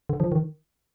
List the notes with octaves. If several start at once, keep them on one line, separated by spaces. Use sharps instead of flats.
D3
F3
D#3